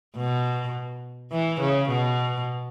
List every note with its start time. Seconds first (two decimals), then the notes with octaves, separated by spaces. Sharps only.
0.17 B2
1.32 E3
1.61 C#3
1.89 B2